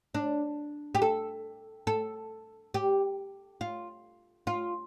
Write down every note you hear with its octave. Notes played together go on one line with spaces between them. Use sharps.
D4
G4
A4
A4
G4
F4
F4